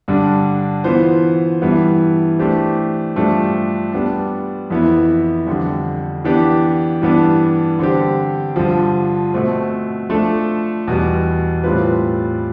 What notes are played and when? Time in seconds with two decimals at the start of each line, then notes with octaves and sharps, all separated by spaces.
0.08 G2 D3 G3 D4
0.84 E3 B3 F4 C5
1.62 G2 E3 G3 B3 E4
2.39 E3 A3 D4 G4 C5
3.16 G2 F3 A3 D4 G4
3.93 G3 B3 D4
4.70 F2 E3 B3 E4
5.47 F2 D3 G3
6.25 E3 B3 D4 G4
7.02 G2 E3 G3 B3 D4
7.79 D3 G3 C4 G4
8.56 G2 D3 F3
9.34 B2 A3 C4
10.09 F3 A3 D4 A4
10.88 E2 B2 G3 B3
11.64 A2 G3 C4 F4 B4